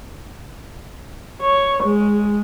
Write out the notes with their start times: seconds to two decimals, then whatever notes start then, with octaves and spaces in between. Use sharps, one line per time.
1.41 C#5
1.83 G#3